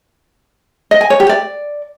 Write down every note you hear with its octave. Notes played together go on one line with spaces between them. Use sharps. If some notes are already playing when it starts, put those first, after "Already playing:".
D#5
G#5
C#5
G4
D5